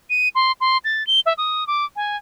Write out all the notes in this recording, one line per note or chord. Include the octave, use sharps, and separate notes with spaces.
D#7
C6
C6
A6
G7
E5
D#6
D6
G#5